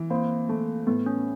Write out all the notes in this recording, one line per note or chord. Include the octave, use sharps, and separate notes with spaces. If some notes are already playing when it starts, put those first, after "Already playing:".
Already playing: E3
A#3 C4
A3
A2 B3
C#4